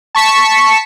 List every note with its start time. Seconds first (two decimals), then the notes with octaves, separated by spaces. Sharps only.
0.15 A5 C#6 B6 C#7 E7